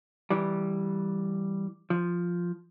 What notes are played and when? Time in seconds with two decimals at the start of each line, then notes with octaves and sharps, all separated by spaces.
0.30 E3 G3
1.90 F3